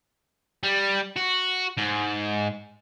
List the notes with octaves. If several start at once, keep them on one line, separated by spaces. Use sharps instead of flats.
G3
F#4
G#2